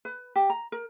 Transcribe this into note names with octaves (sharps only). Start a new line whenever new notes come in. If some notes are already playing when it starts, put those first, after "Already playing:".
B4
G4
A#5
A#4